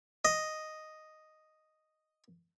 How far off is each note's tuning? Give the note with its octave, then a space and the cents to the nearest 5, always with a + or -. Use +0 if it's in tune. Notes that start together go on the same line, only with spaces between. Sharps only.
D#5 +0